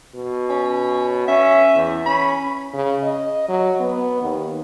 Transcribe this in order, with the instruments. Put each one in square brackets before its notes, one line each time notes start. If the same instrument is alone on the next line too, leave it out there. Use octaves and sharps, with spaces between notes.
[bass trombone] B2
[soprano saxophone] C#4
[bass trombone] C#4 [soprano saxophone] E5
[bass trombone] E2
[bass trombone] C#4 [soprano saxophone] B5
[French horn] C#3
D#5
F#3
B3
D#2